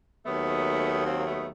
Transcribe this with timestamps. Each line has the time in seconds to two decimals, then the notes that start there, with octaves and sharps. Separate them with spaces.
0.25 D#2 D#3 F#3 A3 B3
1.05 A#3 C4
1.19 A#3
1.25 A3 B3